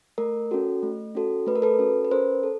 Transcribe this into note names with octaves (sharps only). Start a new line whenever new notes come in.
A3 A#4
C#4 F#4 A4
A3
C#4 F#4 A4
A3 B4
A#4
A4 B4
C#4 F#4 A4
B4
C#4 A#4 C5
A4